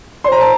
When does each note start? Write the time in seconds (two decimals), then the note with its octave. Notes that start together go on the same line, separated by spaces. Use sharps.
0.24 D5 C6
0.28 C5 A#5
0.41 A5